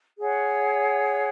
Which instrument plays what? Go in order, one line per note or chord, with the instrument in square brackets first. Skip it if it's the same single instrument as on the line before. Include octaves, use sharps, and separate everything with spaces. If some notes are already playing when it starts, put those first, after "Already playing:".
[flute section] G#4 C#5 F#5